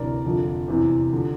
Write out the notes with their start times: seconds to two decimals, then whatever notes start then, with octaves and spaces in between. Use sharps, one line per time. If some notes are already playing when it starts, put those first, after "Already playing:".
Already playing: D2 C3 E3 A#4 D5
0.25 F1 F2 D3 F3
0.68 E2 C3 E3
1.13 D3 F3